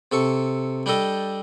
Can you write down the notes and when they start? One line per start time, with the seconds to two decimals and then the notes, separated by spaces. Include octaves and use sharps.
0.12 C3 A4 C#6
0.86 G3 D4 G4 A4 D#5